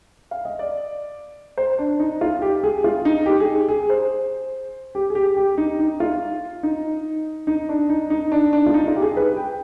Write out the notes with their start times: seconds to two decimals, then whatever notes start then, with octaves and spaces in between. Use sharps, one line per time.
0.31 F5
0.45 D#5
0.59 D5
1.58 C5
1.79 D4
2.00 D#4
2.21 F4
2.42 G4
2.64 G#4
2.84 F4
3.05 D#4
3.26 G4
3.40 G#4
3.69 G#4
3.90 C5
4.95 G4
5.10 G#4
5.15 G4
5.37 G4
5.58 D#4
5.79 D#4
6.00 F4
6.63 D#4
7.47 D#4
7.69 D4
7.90 D#4
8.10 D#4
8.32 D4
8.53 D4
8.66 F4
8.74 D#4
8.88 F4
8.96 G4
9.02 G#4
9.17 B4
9.37 G5